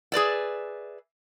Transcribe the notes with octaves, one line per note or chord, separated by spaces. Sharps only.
G#4 B4 D5 E5